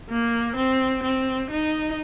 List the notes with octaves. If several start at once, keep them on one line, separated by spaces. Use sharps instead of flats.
A#3
C4
C4
D#4